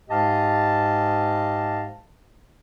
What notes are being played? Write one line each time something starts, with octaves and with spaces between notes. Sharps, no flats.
G#2 G#3 G4 D#5 F5 A5